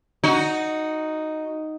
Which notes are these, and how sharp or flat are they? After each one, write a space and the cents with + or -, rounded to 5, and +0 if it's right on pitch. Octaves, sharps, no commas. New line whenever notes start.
D#4 +0 F#4 +0